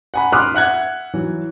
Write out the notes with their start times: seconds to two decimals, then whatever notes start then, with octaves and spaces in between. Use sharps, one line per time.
0.14 F#5 G#5 B5
0.32 B5 C6 D6 D#6 F6 F#6
0.54 E5 F#5 F#6 G#6
1.14 E3 F#3